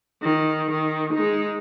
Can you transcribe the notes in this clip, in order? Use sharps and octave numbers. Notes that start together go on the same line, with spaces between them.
D#3
D#3
G#3 D#4